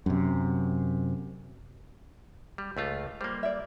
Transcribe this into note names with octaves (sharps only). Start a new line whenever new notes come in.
F#2 C3
G3
C#2 A3 F4
G3 A#3 C5
D5 E5